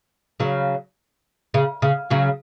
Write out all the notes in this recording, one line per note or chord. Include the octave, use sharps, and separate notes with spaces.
C#3 F#3
C#3
C#3
C#3 F#3